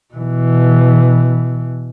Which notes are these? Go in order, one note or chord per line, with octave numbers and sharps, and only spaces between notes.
B2 E3